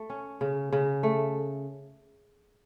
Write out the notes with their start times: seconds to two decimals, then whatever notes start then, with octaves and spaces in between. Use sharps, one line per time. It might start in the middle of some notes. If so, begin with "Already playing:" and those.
Already playing: A3
0.10 C#4
0.41 C#3
0.72 C#3
1.03 A3